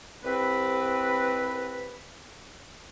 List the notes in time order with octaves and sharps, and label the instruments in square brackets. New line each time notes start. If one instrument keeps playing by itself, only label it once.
[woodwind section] C2 C4 B4